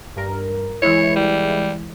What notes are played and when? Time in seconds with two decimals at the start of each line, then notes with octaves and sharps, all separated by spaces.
0.16 G2 A#4
0.82 E3 G#3 E4 C#5
1.16 G3